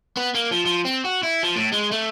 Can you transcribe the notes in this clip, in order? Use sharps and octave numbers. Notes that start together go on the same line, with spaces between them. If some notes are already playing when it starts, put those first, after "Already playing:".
B3
A#3
F3
F3
C4
F#4
E4
F3
A2
G#3
A3